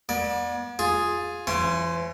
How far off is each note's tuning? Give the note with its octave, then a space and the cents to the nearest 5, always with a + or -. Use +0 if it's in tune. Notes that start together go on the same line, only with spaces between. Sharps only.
B3 -40 D5 +15
F4 +15 G#4 +0
E3 +40 C#4 -15 C6 -5